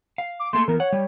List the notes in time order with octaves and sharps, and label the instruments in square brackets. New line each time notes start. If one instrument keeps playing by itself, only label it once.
[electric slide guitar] F5
[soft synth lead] D6
[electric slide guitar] A3 A#3 A4 [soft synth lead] C6
[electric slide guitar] E3 B3 [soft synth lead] A#4
[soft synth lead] C#5 [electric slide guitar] F#5
[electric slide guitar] G3